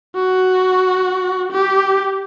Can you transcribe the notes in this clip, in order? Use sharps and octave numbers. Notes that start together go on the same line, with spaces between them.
F#4
G4